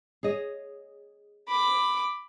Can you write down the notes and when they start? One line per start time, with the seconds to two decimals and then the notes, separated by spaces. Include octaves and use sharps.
0.23 G#4 C#5 D#5
1.48 B5 D6